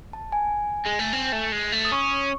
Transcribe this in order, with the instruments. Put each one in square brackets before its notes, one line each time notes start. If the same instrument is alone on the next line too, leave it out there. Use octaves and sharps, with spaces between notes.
[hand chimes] A5
G#5
[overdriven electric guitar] G#3
A3
C4
A3
G#3
A3
[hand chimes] D#6
[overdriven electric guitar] C#4 [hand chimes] C#6